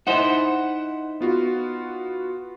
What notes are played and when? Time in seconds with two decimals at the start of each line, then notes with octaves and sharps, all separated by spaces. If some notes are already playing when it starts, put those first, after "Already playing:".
0.07 D#4 E4 C5 F#5
1.21 B3 F4 F#4